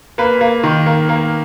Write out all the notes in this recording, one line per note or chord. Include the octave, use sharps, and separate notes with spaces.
A#3 B4
A#3
D#3
A#3
A#3